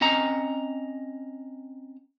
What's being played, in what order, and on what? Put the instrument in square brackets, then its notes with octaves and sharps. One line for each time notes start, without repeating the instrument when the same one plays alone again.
[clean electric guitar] C4 C#4 D#5 F#5 A#5